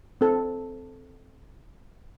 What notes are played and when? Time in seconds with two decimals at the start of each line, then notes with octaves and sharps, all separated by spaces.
0.21 C4 A4